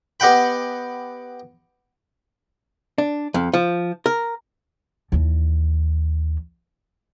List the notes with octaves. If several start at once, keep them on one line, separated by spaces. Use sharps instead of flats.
B3 G4 D#5 F#5 G5 B5
D4
F2
F3
A#4
D#2 E3